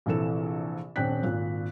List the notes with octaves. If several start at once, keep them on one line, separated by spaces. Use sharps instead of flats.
A#1 C3 E3 A4 E7
D#1 C4 D4 G5 F#6 B6
G#1 A#2